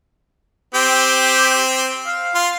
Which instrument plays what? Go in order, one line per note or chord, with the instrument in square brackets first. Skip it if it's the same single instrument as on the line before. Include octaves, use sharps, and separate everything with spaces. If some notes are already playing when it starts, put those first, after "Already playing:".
[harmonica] C4 [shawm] G4
[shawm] F5
[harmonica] F4